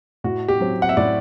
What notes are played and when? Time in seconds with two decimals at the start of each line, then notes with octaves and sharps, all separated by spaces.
0.24 A2 F#4
0.48 G4
0.61 F#3 C4
0.82 F#5
0.89 E5
0.97 A2 D5